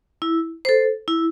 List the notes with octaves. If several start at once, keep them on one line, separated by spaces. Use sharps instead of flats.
E4
A4 C5
E4